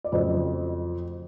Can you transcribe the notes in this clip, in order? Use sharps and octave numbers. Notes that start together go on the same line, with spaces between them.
D5
F2 C#3 F#3 A3 C4 D#5